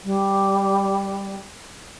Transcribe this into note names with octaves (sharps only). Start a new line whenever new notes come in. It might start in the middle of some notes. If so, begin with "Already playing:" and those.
G3